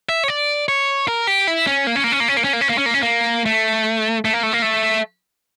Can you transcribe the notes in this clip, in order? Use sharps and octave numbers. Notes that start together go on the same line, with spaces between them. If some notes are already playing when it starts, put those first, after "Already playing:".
E5
C#5
D5
C#5
A#4
G4
E4
C#4
A#3
C#4
A#3
C#4
A#3
C#4
A#3
C#4
A#3
C#4
A#3
C#4
A#3
C#4
A#3
A3
A3
A#3
A3
A#3
A3